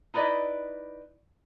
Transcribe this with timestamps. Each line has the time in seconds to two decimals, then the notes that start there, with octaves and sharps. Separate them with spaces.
0.14 D#4 E4 B4 D5 D#5